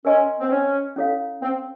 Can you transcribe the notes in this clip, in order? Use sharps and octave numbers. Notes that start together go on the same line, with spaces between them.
C#4 A#4 D#5 G#5 C6
C4
C#4
C#4 E4 A4 C#5 F5
C4